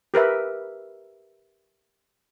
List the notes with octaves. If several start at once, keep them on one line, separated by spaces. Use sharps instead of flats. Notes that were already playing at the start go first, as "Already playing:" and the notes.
G4 A#4 B4 E5